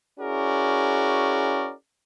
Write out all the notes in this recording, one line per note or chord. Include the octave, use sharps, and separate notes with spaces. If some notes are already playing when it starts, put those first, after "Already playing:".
C#4 E4 F#4 G#4 A#4 D5